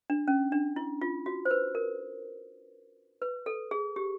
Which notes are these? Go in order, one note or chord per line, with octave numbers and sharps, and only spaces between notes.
D4
C#4
D4
E4
F4
F#4
C5
B4
A#4
B4
A4
G#4
G4